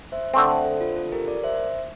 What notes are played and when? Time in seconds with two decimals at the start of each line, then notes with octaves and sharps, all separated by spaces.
0.12 C5 E5
0.34 D3 A3 C4
0.49 A4 C5
0.65 A4 C5
0.80 F4 A4
0.96 F4 A4
1.12 G4 A#4
1.28 A#4 D5
1.43 C5 E5